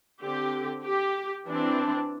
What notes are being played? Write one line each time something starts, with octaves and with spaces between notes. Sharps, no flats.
D3 C4 G4
G4
E3 C4 D4